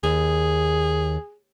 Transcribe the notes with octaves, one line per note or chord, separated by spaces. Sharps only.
D#2 G#4